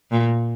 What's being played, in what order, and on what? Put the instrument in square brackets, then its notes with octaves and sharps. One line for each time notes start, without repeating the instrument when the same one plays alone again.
[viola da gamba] A#2